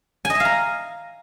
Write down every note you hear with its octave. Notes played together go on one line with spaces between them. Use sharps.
G#5
D#5
E5
F5
A#5